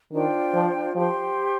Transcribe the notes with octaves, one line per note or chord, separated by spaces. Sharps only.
D#3 D4 F4 C5 G5
F3
F3 G4 C5 G5 C6